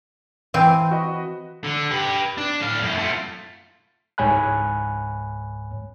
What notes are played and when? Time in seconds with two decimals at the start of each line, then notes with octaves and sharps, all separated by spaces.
0.54 E3 C4 F5
0.91 F#4 D#5 B5
1.64 D3
1.91 G4 B4
2.38 D4
2.60 A2 F5
2.81 F#2 A2
2.98 A3 F4
4.18 C#2 G#2 C#5 G#5 B5 F#6